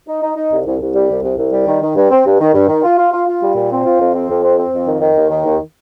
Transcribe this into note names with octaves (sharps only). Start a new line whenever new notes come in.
D#4
D#4
D#4
C2
C2
C2
G3
C2
C2
C2
G3
D#3
D#3
G2
C4
G2
D#3
G2
D#3
F4
F4
F4
F4
G3
A#2
C4
F4
F2
C4
F2
C4
C4
F2
D#3
D#3
D#2
D#3
D#2